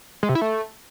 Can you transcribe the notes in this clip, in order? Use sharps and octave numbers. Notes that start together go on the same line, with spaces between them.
G#3
C3
E4
A3